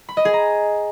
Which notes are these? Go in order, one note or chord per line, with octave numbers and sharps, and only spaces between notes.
B5
D#5
G#4
A#5